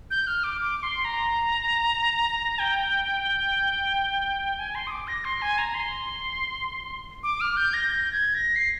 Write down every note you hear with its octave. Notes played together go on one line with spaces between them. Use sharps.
G6
F6
D6
D6
C6
A#5
G5
G#5
C6
D#6
D6
A#6
C6
G#5
A#5
C6
D6
F6
G6
A#6
G6
G#6
A#6
C7